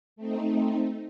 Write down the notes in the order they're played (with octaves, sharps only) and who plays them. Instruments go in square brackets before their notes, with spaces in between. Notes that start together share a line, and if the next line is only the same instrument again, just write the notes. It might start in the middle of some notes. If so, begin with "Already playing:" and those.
[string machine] A3 C4 D#4